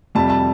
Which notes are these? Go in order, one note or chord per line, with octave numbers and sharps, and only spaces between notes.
F2 C3 G3 A5
A5